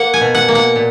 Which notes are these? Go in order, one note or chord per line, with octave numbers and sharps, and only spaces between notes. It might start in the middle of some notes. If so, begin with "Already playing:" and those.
Already playing: A#3 F#5
G#5
B2
F#5
A#3
F#5
A#2